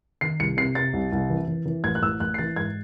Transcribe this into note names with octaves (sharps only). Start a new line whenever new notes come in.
D#3 C7
C2 C#7
C3 C7
C3 A6
C2
C2
E3
E3
E3
A1 G#6
F#6
A1 E6
A1 F#6
C7
E3 A6
G#2 G#6